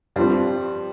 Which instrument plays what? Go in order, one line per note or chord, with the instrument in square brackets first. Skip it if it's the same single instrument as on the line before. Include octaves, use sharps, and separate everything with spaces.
[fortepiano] G2 F3 C4 [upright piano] G3